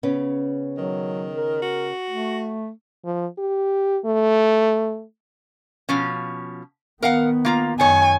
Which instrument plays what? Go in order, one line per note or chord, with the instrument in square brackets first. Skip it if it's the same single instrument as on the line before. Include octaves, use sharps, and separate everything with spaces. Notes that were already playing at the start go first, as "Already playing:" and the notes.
[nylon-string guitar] C#3 B3 C#4
[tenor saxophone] D#3 [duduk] F#3
[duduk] A#4
[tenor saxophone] F#4
[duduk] A3
[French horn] F3
G4
A3
[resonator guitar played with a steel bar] B2 F3 C#4
[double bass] D#3 B3 [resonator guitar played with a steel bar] A#4 F5 F#5
[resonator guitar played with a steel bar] A#3 F4 A#5
[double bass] F#2 [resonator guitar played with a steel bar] D#3 C#5 [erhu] G#5